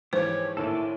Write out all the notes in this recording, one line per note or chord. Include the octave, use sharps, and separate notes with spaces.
G#2 E3 F3 G4 C5 C#5
A#1 A2 D#3 A4 D5